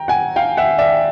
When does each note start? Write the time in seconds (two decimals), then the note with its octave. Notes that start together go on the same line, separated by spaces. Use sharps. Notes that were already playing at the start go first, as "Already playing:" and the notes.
Already playing: G5 A#5
0.08 F#5 G#5
0.36 F5 G5
0.57 E5 F#5
0.78 D5 E5